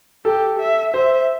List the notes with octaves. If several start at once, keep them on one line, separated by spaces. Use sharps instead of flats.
G4 A4
E5
C5 E5